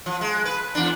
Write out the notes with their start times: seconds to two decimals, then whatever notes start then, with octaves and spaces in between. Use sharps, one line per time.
0.06 F3
0.21 G#3
0.45 B4
0.75 E2 D4